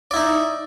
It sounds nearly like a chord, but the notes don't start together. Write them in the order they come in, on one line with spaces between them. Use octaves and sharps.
D5 E4 D#4